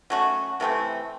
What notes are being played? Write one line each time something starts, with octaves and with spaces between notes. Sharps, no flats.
F#3 A3 C#4 F#4
C3 E3 A3 C4